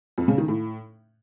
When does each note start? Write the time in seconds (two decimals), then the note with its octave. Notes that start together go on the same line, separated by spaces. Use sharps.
0.18 F2
0.28 C#3
0.38 D#3
0.48 A2